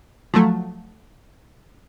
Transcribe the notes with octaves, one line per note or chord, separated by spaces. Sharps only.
F3 F#3 A3